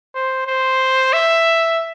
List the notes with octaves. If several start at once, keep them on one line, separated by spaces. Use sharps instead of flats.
C5
C5
E5